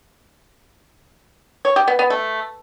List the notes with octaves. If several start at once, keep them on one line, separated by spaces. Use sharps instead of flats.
C#5
G4
B3
B3
A3